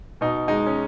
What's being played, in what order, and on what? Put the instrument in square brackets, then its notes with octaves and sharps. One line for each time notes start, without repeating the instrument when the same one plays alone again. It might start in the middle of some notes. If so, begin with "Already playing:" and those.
[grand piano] B2 D#4
G#3 D#4
C#4